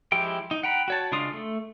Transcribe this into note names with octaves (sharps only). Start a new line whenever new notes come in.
F3 G#3 E4 G4 G5
D#4
F#5 G5 A#5 B5
F#4 C#5 A5
C#3 G#3 D4 F4 D#6
A3